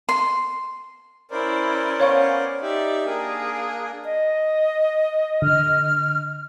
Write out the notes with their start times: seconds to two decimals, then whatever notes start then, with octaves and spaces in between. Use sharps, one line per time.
0.09 C6
1.31 C#4 E4 A#4 C5 D5
2.00 B3 C#4 C#5 F5 C#6
2.62 D#4 G4 D5 E5
3.05 A#3 D4 G#4 A#4
4.05 D#5
5.42 D3 F6